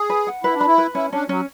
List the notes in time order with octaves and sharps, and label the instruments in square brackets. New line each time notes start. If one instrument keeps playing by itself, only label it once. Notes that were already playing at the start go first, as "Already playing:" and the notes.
Already playing: [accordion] G#4
[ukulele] B4
F#5
[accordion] E4 [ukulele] B4
[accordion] D4
[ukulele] B5
[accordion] E4
[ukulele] B4
[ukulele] C#4 [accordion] E4
[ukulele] C#4 [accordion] D4
[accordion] F#3 [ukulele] C#4